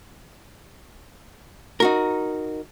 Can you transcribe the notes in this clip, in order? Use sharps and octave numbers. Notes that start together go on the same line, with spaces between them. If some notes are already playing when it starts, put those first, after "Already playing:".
D#4 F#4 A#4